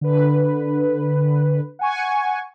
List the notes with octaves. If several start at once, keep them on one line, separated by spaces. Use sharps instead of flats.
D3 B4
F#5 G#5 C#6